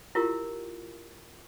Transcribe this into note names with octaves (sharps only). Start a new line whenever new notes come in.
E4 F4 G4 A#4